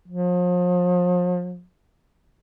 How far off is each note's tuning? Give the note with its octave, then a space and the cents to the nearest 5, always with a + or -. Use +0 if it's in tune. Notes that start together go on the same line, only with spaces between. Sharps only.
F3 +40